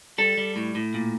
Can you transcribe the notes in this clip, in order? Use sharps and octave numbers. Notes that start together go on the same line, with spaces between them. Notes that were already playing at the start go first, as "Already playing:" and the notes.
G3 A4
G3
A2
A2
A#2